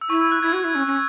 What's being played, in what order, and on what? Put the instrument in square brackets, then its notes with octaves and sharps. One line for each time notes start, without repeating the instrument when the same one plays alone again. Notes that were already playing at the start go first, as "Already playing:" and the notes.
[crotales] E6
[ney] E4 [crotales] C#6
[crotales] E6
F#6
[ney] E4 [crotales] G#6
[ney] F#4
E4
C#4
C#4